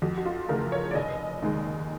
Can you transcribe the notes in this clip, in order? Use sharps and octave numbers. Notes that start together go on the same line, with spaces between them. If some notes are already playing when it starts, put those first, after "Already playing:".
F2 F#4
F#4
F4
C#3 E3 A3 A#4
C#5
D5
F1 D#5
D#2 D#3 G#3